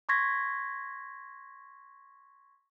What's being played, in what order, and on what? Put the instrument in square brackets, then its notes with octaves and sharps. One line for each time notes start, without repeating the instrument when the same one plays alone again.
[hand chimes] C6 C#6 G#6 A#6 B6